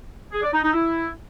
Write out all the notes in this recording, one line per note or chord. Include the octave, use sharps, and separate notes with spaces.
G#4
D5
D#4
D#4
E4